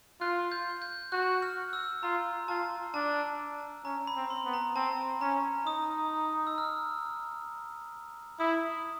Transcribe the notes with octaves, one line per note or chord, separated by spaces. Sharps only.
F4 F#6
G6
G6
F#4 F#6
F6
E6
F4 A#5
F4 A5
D4 A5
C#4 A#5
B5
C4
C6
B3
A#5
C4 A5
C#4 A#5
D#4 D#6
E6
F6
E4 D#6